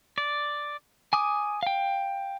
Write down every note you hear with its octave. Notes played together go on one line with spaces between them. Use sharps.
D5
G#5 D6 D#6
F5 G5